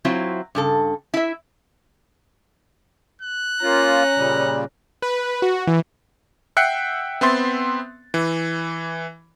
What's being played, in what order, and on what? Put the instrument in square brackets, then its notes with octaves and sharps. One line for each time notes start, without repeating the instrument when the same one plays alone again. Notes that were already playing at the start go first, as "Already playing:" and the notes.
[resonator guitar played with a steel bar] F#3 C4 E4 F4
G2 C#3 A4
E4 E5
[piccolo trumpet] F#6
[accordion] A#3 F4 [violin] C#4 A#5
[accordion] A#2 C#3 G3
[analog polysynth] B4
F#4
E3
[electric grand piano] E5 F#5 G5 F#6 C7 C#7
B3 C4 E5 C6 A6
E3